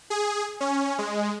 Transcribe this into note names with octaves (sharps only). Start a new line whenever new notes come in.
G#4
C#4
G#3